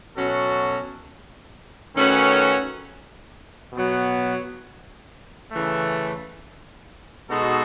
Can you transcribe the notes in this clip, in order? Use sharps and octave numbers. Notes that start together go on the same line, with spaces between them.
B2 F#3 C#4 F#4 A4
D#3 A3 C#4 F#4 B4
B2 F#3 B3
C#3 E3 A3
B2 G#3 D#4 F#4 A4